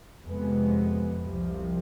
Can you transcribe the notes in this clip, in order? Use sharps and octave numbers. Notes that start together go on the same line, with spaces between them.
F2 C3 G#3 B3
C2 C3 F3